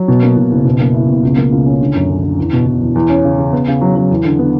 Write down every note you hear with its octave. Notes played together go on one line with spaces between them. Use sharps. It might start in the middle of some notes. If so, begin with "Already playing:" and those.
Already playing: F#3
B2
A#3
B2
F#1
B2
A#3
E4
B2
C#2
A#3
C#2
C#4
D3
F#2
D3
D3
E2
B2
B2
E2
E2
C#4
C#3
C#3
B3
C#3
F#3
F#3
E2
D3
B3